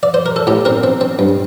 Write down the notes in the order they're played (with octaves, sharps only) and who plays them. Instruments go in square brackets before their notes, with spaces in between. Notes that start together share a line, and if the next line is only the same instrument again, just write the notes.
[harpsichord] D5
C5
A#4
A4
A2 G4
C4 A#4
C4
C4
G2